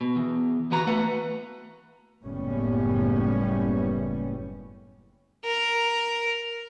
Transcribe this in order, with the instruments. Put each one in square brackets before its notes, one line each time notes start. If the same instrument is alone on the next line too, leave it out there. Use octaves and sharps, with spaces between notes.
[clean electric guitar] B2
E2
E3 B3 F#4 A#5
A3 B4 F#5
[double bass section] F#1 A2 G3 B3 C#4
[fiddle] A#4